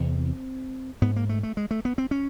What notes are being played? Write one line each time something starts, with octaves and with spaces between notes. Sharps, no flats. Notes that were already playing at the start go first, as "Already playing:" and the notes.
Already playing: E2 C3 C4
G#2 B3
A#3
A3
A3
G#3
A3
B3
C4
C#4